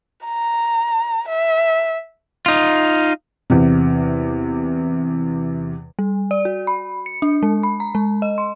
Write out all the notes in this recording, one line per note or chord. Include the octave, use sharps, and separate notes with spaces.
A#5
E5
D#4 F4
E2 C3
G3
D5
F#4
B5
C#7
D4
G#3
B5
A#5
G#3
D#5
C6